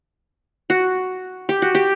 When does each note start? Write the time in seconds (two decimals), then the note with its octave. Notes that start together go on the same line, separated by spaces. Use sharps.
0.70 F#4
1.49 G4
1.62 F#4
1.75 G4